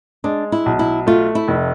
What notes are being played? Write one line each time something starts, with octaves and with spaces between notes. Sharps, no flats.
G#3 D4
E4
B1
E4
A3 F4
E4
F1